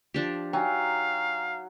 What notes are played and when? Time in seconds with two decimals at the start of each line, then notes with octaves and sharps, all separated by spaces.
0.14 F3 D4 G4
0.53 F#3 D#4 F5 G5 G#5